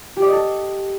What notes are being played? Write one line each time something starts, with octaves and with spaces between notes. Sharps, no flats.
G4
D5
D#5
A4